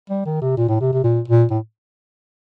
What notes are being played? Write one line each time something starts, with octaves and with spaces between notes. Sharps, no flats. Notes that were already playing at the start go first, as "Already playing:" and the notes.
G3
D#3
C3
A#2
A2
C3
C3
A#2
A#2
A2